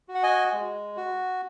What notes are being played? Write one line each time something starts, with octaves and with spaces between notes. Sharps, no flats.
F#4
F#5
D#5 G#5
G#3
F#4